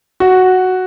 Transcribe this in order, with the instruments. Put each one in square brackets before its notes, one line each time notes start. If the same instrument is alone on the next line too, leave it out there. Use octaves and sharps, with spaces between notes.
[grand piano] F#4